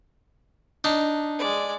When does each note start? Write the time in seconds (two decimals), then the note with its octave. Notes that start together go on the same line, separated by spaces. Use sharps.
0.84 D4 D#4
1.39 G#3 D5